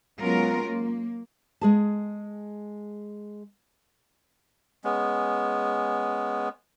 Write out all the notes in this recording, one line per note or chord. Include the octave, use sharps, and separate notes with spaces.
F#3 G#3 B3 C#4 F4 A#4
A#3
G#3 G#4 A5
G#3 B3 C#4